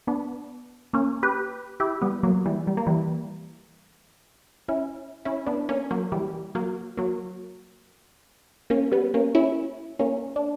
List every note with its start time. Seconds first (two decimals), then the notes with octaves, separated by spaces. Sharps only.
0.07 B3 D4
0.93 A#3 C#4
1.23 G4 B4
1.80 E4 G4
2.02 G3 B3
2.23 F#3 A#3
2.46 E3 G3
2.67 G3
2.77 A#3
2.86 E3 G3
4.68 C#4 E4
5.25 C#4 E4
5.46 B3 D4
5.69 A#3 C#4
5.91 F#3 A#3
6.12 E3 G3
6.55 F#3 A#3
6.97 F#3 A#3
8.70 A#3 C#4
8.92 G3 B3
9.14 A#3 C#4
9.35 C#4 E4
9.99 A#3 C#4
10.36 D4